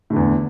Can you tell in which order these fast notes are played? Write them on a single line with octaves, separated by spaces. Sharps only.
A2 D3 E2